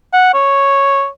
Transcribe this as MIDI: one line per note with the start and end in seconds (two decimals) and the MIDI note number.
0.13 0.31 78
0.34 1.07 73